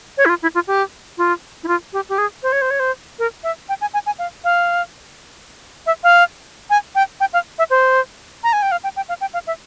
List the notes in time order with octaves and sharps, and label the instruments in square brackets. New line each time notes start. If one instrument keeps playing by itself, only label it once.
[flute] C#5
E4
F4
E4
F4
G4
F4
E4
F4
G4
G4
G#4
C5
C#5
C5
C#5
C5
A#4
E5
G5
G#5
G#5
G#5
F5
F5
E5
F5
G#5
G5
G5
F5
E5
C5
A#5
G#5
G5
F5
G5
G5
F5
G5
F5
E5